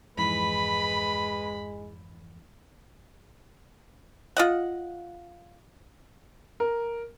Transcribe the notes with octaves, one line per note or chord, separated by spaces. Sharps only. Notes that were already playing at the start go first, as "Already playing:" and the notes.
F2 G#2 E3 G#3 B4 B5
F4 D#5 F#5
A#4